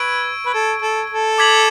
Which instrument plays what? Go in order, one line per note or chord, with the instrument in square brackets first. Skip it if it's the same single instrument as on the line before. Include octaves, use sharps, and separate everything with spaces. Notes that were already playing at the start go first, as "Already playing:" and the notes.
Already playing: [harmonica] B4 [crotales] C#6 E6 G#6 D7
[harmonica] B4
A4
A4
A4
[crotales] D6 G#6 B6 F#7